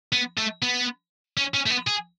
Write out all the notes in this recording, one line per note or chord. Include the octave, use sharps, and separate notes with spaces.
B3
A3
B3
C#4
C#4
A3
B3
G#4